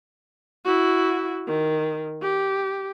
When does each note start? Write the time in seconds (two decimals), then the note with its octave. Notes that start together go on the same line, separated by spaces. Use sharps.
0.65 E4 F#4
1.47 D#3
2.22 G4